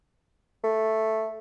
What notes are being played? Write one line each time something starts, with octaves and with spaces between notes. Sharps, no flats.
A3